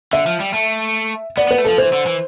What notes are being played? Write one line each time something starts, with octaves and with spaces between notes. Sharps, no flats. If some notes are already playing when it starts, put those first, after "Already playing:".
D3 E5
F3
G3
A3
B3 D5
B3 B4
A3
F3 A4
E3 C5
D3
E3